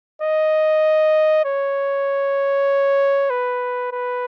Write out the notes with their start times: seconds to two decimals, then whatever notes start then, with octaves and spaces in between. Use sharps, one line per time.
0.22 D#5
1.45 C#5
3.30 B4
3.92 B4